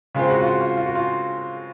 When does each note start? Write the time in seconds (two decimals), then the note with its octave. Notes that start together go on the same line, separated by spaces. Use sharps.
0.15 C#3 G#3 C4 F4
0.30 F#4
0.40 F4
0.46 F#4
0.61 F4
0.77 F4
0.86 F#4
0.95 F4